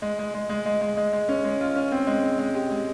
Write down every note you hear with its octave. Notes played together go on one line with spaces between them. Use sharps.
G#3
G#3
G#3
G#3
G#3
G#3
G#3
G#3
C#4
G#3
F4
C#4
C4
G#3
C4
G#3
G4
G#3